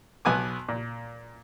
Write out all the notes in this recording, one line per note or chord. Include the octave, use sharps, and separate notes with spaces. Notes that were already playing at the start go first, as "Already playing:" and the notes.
B1 B3 G#5 D6
A#2